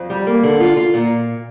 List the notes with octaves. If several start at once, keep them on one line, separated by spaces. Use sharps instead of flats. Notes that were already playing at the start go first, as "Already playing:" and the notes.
Already playing: F2
G3
A#3
D3
F4
F4
A#2